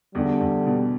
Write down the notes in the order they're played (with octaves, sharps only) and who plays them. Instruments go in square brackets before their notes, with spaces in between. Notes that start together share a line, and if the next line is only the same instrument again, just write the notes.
[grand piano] E2 [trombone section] D3 G3
[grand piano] E2
B2